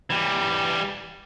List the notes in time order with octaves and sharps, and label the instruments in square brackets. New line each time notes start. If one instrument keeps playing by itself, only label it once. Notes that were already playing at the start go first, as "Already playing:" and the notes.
[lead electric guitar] E3 G3